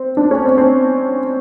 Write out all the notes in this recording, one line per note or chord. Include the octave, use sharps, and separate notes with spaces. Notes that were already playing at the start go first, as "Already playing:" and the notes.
Already playing: C4
D4
C#4
C4
C4